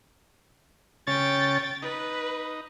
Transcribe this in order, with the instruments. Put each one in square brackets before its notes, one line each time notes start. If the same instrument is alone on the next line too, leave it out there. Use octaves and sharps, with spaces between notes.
[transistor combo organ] C#3 C#4 C#5 [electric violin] G5 A6
[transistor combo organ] D#4 [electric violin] B4